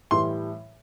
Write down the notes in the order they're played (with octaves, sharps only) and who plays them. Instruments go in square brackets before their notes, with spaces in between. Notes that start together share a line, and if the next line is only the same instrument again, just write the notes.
[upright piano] A2 E3 G3 C6